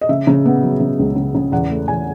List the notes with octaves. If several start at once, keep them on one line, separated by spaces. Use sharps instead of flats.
D#5
C#3 E5
C#3
B3
F#3
C#3
C#2
C#3
C#3
E2 F#5
A3
E2 G#5